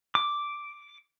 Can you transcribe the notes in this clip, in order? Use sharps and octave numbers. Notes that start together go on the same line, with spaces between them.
D6